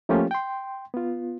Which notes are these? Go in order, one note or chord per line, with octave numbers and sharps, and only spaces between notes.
F3 A3 A#3 C#4 F4 G4
G5 C6
B3 F4